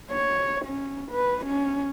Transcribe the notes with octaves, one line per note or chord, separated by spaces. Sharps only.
C#5
C#4
B4
C#4